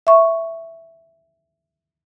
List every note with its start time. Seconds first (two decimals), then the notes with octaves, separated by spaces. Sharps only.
0.07 E5 C#6